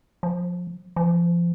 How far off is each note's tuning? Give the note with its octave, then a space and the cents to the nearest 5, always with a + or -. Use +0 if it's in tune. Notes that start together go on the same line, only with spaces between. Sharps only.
F3 +25
F3 -25